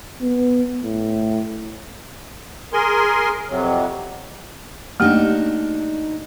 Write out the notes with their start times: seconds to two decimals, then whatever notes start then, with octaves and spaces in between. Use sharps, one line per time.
0.21 B3
0.83 A2
2.73 G#4 A#4 G#5 C6
3.50 F2 C3 F#3
5.00 A3 A#3 D4 D#4 F#4 G4